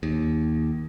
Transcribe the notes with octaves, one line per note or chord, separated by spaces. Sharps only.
D#2